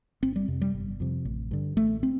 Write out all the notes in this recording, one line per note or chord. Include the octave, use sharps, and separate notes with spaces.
G1 C4
G3
F2 C3
G3
G1
F2 C3
A1
G2 D3
A1 A3
C4